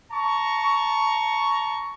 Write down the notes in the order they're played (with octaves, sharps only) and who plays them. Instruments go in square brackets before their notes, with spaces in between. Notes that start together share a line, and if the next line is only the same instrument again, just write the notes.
[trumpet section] A5 A#5 C#6